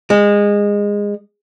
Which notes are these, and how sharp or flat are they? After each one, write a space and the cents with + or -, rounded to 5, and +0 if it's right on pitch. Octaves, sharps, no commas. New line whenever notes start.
G#3 -20